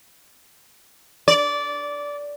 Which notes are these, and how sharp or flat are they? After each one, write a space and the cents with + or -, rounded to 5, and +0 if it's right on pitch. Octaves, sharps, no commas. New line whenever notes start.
D5 -15